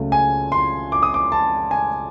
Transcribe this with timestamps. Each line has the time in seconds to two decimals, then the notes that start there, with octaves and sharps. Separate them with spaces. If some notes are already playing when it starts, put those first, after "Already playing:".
Already playing: C#2 C#3 F#3 A3
0.12 G#5
0.52 C6
0.92 D6
1.03 D#6
1.14 D6
1.32 A5
1.71 G#5